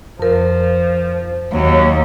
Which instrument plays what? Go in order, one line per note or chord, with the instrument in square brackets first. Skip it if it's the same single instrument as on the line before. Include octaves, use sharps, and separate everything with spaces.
[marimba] F2 A#4 [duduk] F3
[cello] D#2 [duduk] F#3